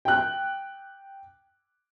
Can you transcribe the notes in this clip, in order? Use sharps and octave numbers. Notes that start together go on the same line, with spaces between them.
G5 F#6